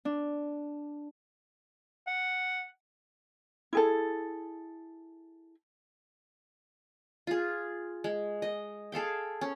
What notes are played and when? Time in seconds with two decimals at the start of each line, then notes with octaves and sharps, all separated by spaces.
0.05 D4
2.07 F#5
3.73 E4 G#4 A4
7.27 F4 G#4
8.04 G#3
8.42 D#5
8.92 G#4 A4 F5 G5
9.41 C#4